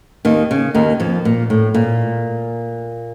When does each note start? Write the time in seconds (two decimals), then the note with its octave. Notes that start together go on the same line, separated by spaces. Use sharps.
0.25 D#2 D#3
0.51 C#3
0.75 D#2 D#3
1.00 F2 F3
1.25 A#2
1.50 A2
1.74 A#2